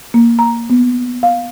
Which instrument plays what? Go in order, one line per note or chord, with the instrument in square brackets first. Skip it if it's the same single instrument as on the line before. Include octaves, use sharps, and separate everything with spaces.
[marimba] A#3
A#5
B3
F5